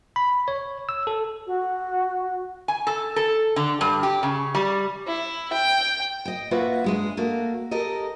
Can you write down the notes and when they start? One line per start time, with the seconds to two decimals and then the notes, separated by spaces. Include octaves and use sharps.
0.16 B5
0.48 C#5
0.89 E6
1.07 A4
1.47 F#4
2.68 G#5
2.87 A4
3.16 A4
3.56 D3
3.81 G2
4.03 G4
4.23 C#3
4.55 G3
5.07 E4
5.53 G5
6.25 D#5 G5
6.51 A#3 F4 F#4 B4 E5 F#5
6.84 G2 G#3 G#4
7.17 A3 A#3 F#4
7.71 G4 A4 A#4 D#5